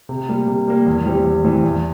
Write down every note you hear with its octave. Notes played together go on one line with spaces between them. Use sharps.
C3
G3 A#3
C3
G3 A#3
E2
E3 G3 C4 G4
E2
E3 G3 C4 G4
E2